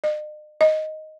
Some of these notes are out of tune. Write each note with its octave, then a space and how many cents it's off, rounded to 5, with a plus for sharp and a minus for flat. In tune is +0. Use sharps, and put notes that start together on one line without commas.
D#5 -45
D#5 +5